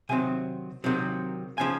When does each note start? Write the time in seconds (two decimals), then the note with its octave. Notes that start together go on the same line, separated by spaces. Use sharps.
0.09 C3 D#3 F#3 C4 G#5
0.84 C3 D#3 F#3 C4
1.58 C#3 F3 G#5